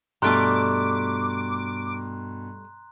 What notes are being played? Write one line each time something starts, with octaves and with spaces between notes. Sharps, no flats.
G2 B2 G3 A3 A#5 C6 D6 F#6